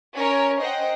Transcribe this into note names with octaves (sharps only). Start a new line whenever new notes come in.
C#4 A#4 C#5
C5 D#5 F#5 G5